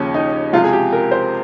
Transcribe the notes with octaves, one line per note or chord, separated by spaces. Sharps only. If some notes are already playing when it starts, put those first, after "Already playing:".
Already playing: D#2 C#3 F3 C#4
D#4
C#2 C3 F3 F4
G#4
G4
A#4
C5